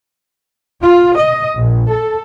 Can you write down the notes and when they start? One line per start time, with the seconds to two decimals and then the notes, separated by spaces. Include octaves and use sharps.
0.81 F4
1.15 D#5
1.56 A#1
1.90 A4